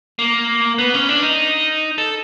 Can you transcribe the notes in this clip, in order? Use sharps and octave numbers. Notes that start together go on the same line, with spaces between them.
A#3
B3
C#4
D4
D#4
A4